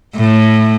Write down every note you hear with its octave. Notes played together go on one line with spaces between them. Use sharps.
A2